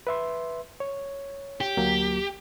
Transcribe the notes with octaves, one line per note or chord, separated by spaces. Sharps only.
B4 E5 C6
C#5
G4
D2 F#3 A#3